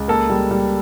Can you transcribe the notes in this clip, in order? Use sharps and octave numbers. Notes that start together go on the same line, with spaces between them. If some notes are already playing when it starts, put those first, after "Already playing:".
Already playing: C#2
A#3 A4
G3
G3